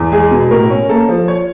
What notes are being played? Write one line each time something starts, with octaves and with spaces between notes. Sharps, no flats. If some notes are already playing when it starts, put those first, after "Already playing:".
Already playing: E2
G#3 G#4
B2
A2 A#4
C#4
A#3 A4
F3
C#5